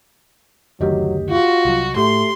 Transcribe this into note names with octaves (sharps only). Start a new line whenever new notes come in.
F#1 D2 D#3 F#3 G4 D#5
F4 F#4
C2 F#3
A2 A3 G4 C6